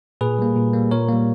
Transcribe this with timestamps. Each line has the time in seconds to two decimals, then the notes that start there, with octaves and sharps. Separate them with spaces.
0.21 A#2 G#4 B4
0.39 G3 A#3
0.56 A#2
0.73 G3 A#3
0.91 A#2 A#4 C#5
1.09 G3 A#3